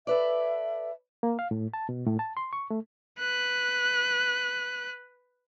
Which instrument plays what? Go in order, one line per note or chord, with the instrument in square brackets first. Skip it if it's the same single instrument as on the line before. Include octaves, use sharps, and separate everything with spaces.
[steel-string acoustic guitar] A4 B4 D5 [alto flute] E5
[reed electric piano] A#3
F5
A2
A5
B2
A2
A5
C6
C#6
A3
[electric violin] B4 F#6